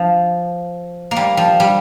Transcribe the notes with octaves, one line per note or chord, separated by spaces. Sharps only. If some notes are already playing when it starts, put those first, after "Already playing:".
Already playing: F3
A#3
G3
F3
G3